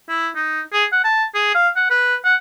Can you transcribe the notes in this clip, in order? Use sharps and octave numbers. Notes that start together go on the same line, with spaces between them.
E4
D#4
G#4
F#5
A5
G#4
F5
F#5
B4
F#5